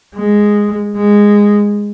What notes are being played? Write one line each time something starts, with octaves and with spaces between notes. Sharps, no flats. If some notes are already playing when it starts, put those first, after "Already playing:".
G#3
G#3